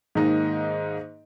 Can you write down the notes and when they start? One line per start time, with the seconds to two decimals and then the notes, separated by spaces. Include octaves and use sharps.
0.15 G#2 D#3 A#3 D#4